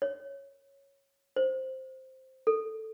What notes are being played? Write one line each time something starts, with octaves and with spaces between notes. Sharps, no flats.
C#5
C5
A4